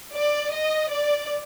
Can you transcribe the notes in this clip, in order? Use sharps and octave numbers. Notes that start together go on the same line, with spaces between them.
D5
D#5
D5